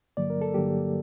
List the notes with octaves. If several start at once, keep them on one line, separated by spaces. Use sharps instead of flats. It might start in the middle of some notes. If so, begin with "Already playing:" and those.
G2 D3 F#3 A#3 D5
A#4
A4
G2 D3 F#3 A#3 G4